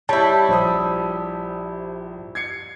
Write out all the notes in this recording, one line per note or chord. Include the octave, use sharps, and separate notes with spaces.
G3 E4 G4 C#5 A5
A#1 C5 D#6
G#6 C7 C#7